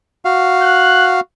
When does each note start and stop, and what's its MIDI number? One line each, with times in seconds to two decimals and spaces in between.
0.25 1.20 66
0.25 1.20 77
0.62 1.06 90